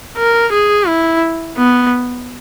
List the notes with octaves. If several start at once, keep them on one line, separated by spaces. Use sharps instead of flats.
A#4
G#4
E4
B3